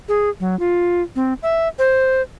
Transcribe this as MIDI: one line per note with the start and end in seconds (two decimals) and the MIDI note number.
0.09 0.29 68
0.40 0.58 54
0.59 1.02 65
1.16 1.34 60
1.43 1.68 76
1.79 2.22 72